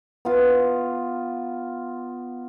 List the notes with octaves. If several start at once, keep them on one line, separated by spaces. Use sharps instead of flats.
B3 F4